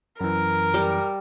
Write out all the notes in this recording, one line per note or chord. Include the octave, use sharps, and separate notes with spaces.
F#2 E3 A#4
G3